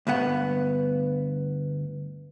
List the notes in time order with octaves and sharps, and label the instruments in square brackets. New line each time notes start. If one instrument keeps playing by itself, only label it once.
[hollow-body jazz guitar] D2 G2 B3 F#5